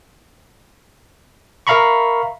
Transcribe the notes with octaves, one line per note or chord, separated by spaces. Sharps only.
A#4 E5 F5 A#5 B5 C#6